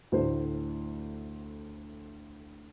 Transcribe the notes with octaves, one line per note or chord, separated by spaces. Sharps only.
D2 A2 C5